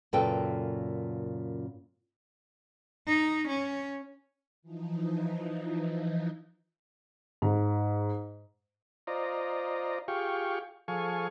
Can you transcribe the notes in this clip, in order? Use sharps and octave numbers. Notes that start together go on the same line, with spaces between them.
F#2 A#2 C#3 A4 B4 G5
D#4
C#4
E3 F3 D#4
G#2
F4 C5 D5 D#5 A#5
F4 G4 G#4 F5 G5 C#6
F3 G#4 A4 F5 G#5 C#6